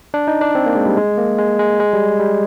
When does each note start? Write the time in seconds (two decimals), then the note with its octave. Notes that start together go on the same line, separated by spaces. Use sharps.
0.14 D4
0.28 D#4
0.41 D4
0.55 C4
0.66 A#3
0.75 G#3
0.86 G3
0.97 G#3
1.17 A#3
1.38 G#3
1.59 G#3
1.80 G#3
1.93 G3
2.20 G3